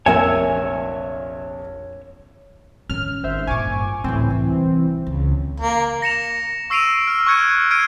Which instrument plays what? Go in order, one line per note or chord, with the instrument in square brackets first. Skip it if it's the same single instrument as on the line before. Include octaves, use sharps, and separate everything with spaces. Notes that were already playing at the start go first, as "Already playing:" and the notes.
[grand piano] F1 A#1 C4 [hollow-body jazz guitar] A#4 E5 G#5 [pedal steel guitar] C#5 E6
[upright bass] D#3 C#4 [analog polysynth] F6
[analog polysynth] G#1 C5 E5
[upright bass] G2 A#2 [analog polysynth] G#5 C#6 D6
[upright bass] D2 A2 [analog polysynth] E3 C4
[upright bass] C2
C#2
[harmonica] A#3
[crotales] A#6 C#7 E7 F7
C#6 E6 C7 D7 D#7 F7
F6 D7
C#6 F#6 G#6 C#7 D#7
F6 G#6 C7 D7 D#7